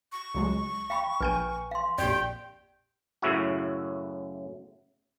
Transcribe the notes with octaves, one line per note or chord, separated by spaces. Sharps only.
C#6
C#2 F#3 G#3
F5 G5 B5
A#1 B4 G#5 G6 D#7
F5 C6
A#1 F2 G4 D5 G5
F#2 A2 C#3 E4 F#4